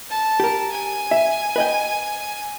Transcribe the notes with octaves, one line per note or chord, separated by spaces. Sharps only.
A5
G4 A#4
G#5
E5
B4 D#5 G5